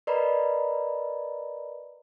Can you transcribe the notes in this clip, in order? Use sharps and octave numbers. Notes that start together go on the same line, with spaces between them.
A#4 B4 D5 D#5 A#5 B5